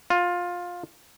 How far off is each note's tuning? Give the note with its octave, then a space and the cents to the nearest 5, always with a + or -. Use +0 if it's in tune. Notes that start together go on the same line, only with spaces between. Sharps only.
F4 +15